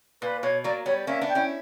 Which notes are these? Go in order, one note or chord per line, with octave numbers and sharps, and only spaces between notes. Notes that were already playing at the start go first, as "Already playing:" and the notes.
A#2 B4
B2 C#5
F#3 A#3 D5
G3 B3 C#5
A#3 C#4 E5
B3 D4
G5
C#4 E4